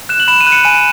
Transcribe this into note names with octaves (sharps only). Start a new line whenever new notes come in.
F#6 E7
F#7
B5 E7
D#7
F#6
C#7
G#5 D#7
E7